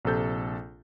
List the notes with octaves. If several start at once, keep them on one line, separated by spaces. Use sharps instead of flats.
A#1 C3 A4 G6